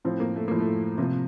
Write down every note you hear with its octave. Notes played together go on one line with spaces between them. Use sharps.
A2 F3 C4
A#3
A3
A2 F3 A#3
A3
C3 F3 A#3